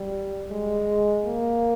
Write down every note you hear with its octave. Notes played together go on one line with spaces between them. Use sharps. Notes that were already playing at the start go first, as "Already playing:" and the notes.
Already playing: G3
G#3
A#3